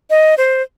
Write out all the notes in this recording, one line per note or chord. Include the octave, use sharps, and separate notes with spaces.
D#5
C5